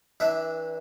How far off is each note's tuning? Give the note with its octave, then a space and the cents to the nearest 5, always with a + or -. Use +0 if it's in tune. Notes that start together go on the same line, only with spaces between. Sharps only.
E3 -30 D4 +0 E5 +0